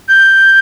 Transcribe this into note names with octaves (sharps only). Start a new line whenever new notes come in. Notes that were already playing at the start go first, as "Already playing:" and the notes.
G6